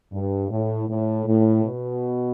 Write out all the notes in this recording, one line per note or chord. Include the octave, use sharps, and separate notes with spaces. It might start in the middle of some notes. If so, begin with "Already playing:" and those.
G2
A2
A2
A2
B2